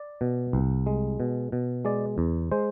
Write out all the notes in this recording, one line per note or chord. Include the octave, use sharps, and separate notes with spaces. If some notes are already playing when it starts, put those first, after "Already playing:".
Already playing: D5
B2
C2
G#3
B2
B2
G#3 D5
E2
G#3 C5